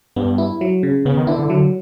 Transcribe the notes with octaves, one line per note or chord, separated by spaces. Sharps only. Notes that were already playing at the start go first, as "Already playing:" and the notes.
G2 B3
E4
F#3
C#3
C#3 B3
D#3
D3 E4
D3
F#3